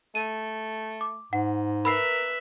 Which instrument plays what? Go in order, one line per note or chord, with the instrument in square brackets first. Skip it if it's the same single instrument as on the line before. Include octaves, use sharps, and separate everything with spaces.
[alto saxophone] A3 [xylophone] D#7
[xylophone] D6
[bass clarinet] G#2 [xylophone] F#5
[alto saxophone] A#4 [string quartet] B4 E5 [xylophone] B5 E6 C7